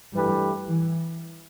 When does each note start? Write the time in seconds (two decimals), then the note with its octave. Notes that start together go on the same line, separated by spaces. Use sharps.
0.14 G2 E3 G3 A3 G4 B4
0.69 E3